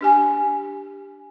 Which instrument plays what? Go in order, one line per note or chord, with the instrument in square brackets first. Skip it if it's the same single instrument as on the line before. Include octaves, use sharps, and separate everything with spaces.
[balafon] D4 G4 G#5